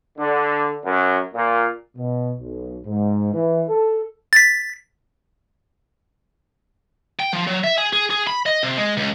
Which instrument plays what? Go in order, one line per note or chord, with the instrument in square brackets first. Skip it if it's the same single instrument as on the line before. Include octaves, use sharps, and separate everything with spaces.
[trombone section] D3
F#2
A#2
[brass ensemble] B2
B1
G#2
E3
A4
[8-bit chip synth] A6 B6
[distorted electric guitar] G5
F3
F#3
E5
G#4
G#4
G#4
B5
D#5
C3
G#3
C#2